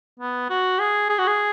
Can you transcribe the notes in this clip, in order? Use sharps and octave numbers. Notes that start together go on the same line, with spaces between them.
B3
F#4
G#4
G#4
F#4
G#4